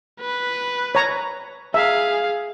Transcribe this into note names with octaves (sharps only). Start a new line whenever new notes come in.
B4
C#5 A#5
G#4 E5 F5